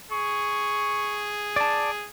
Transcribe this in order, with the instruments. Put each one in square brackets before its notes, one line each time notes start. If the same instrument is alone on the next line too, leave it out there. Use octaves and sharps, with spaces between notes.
[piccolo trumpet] G#4 [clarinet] C#6
[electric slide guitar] D5 A5